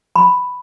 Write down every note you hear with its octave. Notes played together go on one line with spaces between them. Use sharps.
B5